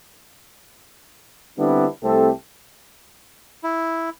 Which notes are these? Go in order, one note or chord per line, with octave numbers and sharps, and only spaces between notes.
D3 G3 B3 C4 D4 E4
C2 A3 C4 G4 A4
E4